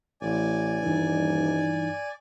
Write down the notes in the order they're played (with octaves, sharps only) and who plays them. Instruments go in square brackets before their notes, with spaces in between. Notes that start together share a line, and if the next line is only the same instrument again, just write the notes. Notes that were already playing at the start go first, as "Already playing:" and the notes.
[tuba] A1 [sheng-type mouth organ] D5 G#5
[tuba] D#1 [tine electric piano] G2 E3 [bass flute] D#4